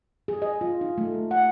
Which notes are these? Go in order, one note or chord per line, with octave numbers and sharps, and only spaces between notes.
G#4
D#5
F4
D#4
A3
A#3
F#5